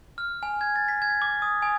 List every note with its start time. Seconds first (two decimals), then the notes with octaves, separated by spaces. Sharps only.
0.18 F6
0.43 G#5
0.61 G#6
0.76 A6
0.88 B6
1.02 G#6
1.22 D6
1.42 D#6
1.62 G#5